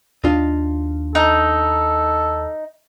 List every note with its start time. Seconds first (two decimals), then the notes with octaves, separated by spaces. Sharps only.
0.24 D#2 D4 F4 D#5
1.15 D#4 A4